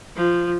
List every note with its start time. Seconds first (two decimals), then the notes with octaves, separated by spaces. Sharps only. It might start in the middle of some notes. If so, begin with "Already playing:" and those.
0.16 F3